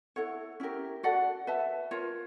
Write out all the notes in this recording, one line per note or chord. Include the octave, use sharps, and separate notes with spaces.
E4 A4 C#5 F#5
C#4 E4 G4 A#4
F#4 A4 D5 F#5
B4 E5 A5
F4 A#4 C#5